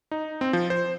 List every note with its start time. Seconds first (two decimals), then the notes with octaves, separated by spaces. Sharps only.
0.11 D#4
0.41 C4
0.53 F3
0.70 C5